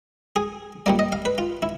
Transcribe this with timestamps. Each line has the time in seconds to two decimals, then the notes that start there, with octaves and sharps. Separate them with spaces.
0.36 G#4
0.86 A#2 G3 A#3 D5
0.99 D#5
1.12 F5
1.25 B4
1.38 F4
1.62 E4